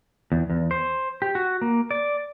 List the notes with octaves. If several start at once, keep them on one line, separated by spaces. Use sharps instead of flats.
E2
E2
C5
G4
F#4
A#3
D5